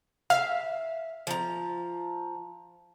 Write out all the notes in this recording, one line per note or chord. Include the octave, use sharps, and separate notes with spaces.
E5 F5
F3 A#5